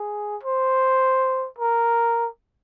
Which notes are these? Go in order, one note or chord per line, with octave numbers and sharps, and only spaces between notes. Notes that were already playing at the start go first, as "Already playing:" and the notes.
Already playing: G#4
C5
A#4